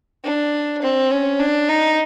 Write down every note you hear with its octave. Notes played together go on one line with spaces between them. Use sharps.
D4
C4
C#4
D4
D#4